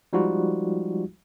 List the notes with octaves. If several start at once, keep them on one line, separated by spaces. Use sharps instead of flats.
F3 G3 G#3 D#4 F4 F#4